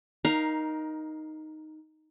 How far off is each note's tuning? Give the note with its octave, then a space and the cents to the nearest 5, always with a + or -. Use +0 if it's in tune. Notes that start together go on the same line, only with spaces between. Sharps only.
D#4 +0 A#4 +20 F5 +0